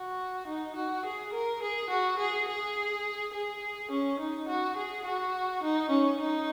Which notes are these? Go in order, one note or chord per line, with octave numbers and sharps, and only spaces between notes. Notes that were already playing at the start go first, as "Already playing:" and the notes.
Already playing: F#4
D#4
F#4
G#4
A#4
G#4
F#4
G#4
G#4
G#4
C#4
D#4
F#4
G#4
F#4
D#4
C#4
D#4